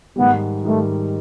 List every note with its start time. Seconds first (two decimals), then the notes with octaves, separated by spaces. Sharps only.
0.16 G#2 D#3 G3 B3
0.65 G#2 D#3 G3 A3